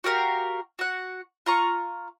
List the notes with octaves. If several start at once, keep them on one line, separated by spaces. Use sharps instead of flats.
F#4 G4 A#4 F5
F#4 F#5
F4 A#5 C#6